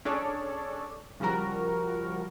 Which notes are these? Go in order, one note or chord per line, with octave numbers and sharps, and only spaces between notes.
C#4 D4 G#4 A4 C#5 D5
C#3 F3 G3 F#4 A#4